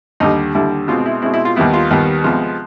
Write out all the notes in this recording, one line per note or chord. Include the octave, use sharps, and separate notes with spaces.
D#2 D3 G3 D#4
D#2 D3 G3 E4
B2 G#3 C4 F4
E4
B2 G#3 C4 E4
E4
F4
D#2 D#3 G3 B3 E4
F4
D#2 D#3 G3 B3
C3 F3 G#3 B3